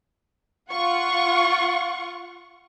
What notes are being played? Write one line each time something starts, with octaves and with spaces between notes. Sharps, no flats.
F4 F#5 C#6